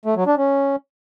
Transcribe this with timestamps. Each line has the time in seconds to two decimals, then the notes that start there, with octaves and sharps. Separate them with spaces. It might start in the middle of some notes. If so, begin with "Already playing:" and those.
0.05 A3
0.16 F#3
0.26 D4
0.37 C#4